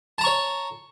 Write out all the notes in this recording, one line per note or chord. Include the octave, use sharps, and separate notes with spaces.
C#5 A5 A#5 C#6